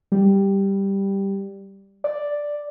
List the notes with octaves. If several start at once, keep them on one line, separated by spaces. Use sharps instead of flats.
G3
D5